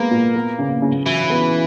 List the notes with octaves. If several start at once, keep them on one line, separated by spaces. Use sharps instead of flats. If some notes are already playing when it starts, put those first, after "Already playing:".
Already playing: G#3 A#3 B3
A#2
B3
C#3
C#3
E3 F#3
B3